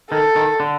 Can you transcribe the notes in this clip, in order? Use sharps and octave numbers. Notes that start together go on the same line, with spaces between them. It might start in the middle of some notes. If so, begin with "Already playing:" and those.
D#3 A4
D#3
D3